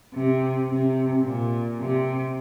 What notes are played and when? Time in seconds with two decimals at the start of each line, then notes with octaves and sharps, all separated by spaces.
0.14 C3
0.70 C3
1.24 A#2
1.80 C3